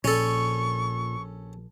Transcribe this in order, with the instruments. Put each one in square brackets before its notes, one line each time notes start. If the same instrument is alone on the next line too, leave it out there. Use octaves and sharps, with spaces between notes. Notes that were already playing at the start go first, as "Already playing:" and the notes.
[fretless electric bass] A#1 [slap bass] A#2 [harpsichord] C#4 A4 [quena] C#6